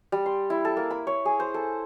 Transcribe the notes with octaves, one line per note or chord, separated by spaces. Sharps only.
G3
C6
E4
A4
A#3
B5
C#5
G#4
C5
A4